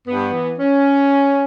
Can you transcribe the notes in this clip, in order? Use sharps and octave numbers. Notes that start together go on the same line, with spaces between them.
G2 B3
E3
C#4